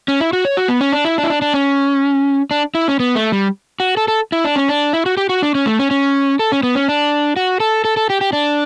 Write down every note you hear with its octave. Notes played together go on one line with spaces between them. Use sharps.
C#4
E4
F#4
C#5
F#4
B3
C#4
D4
E4
D4
E4
D4
D4
C#4
D4
E4
C#4
B3
A3
G3
F#4
A4
A4
E4
D4
C#4
D4
E4
F#4
G4
F#4
D4
C#4
A3
C#4
C#4
A4
C#4
B3
C#4
D4
F#4
A4
A4
A4
G4
G4
D4